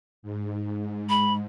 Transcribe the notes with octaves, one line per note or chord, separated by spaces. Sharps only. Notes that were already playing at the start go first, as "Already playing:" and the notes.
G#2
B5